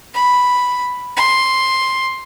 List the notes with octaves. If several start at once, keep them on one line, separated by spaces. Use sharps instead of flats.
B5
C6